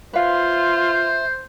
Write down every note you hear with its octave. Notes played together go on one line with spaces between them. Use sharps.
F4 B4 C5 E5 F5